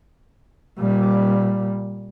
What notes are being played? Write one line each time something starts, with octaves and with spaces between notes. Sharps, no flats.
A#2 G3